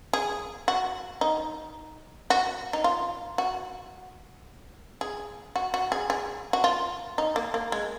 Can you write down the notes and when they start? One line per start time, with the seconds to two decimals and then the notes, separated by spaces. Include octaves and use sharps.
0.13 G#4
0.68 F#4
1.21 D#4
2.30 F#4
2.73 D#4
2.84 F4
3.38 F#4
5.01 G#4
5.56 F#4
5.74 F#4
5.92 G#4
6.10 G#4
6.53 F#4
6.64 F4
7.18 D#4
7.36 A#3
7.54 A#3
7.72 G#3